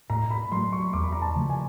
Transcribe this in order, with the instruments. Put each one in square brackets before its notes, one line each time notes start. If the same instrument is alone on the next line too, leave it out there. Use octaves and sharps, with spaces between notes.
[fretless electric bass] A2 [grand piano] A#5
[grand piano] B5
[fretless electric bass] F#3 A3 [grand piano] C6
[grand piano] C#6
[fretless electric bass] E2 [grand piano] D6
[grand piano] B5
A#5
A5
[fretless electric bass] C#3 F3 A3
[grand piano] G#5